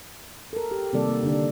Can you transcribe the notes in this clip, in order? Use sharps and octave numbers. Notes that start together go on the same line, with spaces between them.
A4 A#4
G4
C3 D#3 G3 A#3 A4 D5
A#3
D3 D4